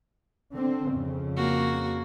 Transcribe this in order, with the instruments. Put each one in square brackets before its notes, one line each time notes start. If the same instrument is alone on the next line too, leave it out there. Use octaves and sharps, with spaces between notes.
[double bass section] D3 C4
F2 C#3
[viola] A#3 F#4